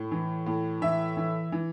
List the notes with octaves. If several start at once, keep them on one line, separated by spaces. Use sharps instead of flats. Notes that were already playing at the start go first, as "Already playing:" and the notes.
Already playing: A2
E3
A2
E3 E5
E3
E3